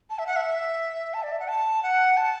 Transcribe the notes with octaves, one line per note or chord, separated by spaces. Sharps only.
A5
E5
F#5
E5
A5
D5
E5
F#5
A5
F#5
A5